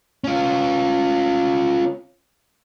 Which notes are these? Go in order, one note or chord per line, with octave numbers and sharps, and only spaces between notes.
C#4 F4